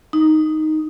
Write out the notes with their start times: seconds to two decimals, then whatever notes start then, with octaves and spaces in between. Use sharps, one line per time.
0.13 D#4